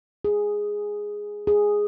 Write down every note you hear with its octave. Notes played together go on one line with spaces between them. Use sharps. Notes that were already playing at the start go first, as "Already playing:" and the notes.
G#4
G#4